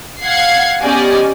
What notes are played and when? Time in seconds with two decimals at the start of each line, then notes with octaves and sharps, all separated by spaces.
0.24 F5 F#5 G#6 C7
0.81 B3 C#4 G4 D5 D#5 G#5